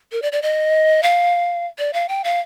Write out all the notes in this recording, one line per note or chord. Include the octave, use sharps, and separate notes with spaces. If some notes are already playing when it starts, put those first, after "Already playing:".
A#4
D5
D5
D#5
F5
D5
F5
G5
F5